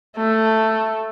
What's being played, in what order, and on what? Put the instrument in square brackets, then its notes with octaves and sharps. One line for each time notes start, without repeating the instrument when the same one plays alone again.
[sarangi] A3